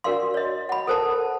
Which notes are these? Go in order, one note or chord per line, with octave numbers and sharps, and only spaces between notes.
D4 F#4 A#4 D5 F5 C6
C#5 D#5
F#5 B5
A4 A#4 C5 F#5 A5